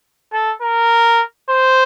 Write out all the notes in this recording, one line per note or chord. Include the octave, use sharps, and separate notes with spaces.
A4
A#4
C5